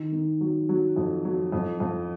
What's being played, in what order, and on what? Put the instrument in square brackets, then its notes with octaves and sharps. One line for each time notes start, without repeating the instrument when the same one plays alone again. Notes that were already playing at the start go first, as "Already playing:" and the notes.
Already playing: [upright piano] D#3
D#3
F#3
F#3
F2
F#3
F2
F2